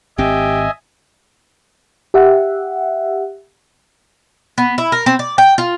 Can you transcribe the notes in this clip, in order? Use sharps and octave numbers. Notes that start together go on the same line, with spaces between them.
G#1 C4 G4 D#5 E5 G#5
G4 E5 F#5
B3
E4
A#4
C4
D5
G5
F4